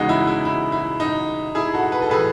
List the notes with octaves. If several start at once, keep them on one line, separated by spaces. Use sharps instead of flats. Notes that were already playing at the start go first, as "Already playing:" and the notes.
Already playing: E2 C#3 G#3 D#4 F#4
E4
E4
E4
E4
D#4
E4 G#4
F#4 A4
B4
A4
A2 E3 A3 G#4 B4